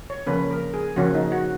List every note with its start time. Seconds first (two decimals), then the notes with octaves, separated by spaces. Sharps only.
0.10 C#5
0.27 C#3 F3 A#3 C#4 B4
0.51 A#4
0.74 G#4
0.96 C#3 F3 A#3 C#4 F#4
1.15 D#4
1.32 F#4